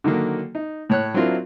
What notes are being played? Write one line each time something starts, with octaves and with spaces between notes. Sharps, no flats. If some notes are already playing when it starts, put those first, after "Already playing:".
D3 D#3 F#3 A#3
D#4
A2 C#5 F#6
F#3 C4 D4 E4 F4 A#4